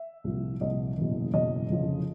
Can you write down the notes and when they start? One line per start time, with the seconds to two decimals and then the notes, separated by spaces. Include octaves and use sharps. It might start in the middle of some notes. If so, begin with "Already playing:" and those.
Already playing: E5
0.24 C2 A#2 F3
0.60 C2 A#2 F3 D#5
0.97 F#1 E2 B2
1.33 F#1 E2 B2 D#5
1.69 F1 F2 C#3 F3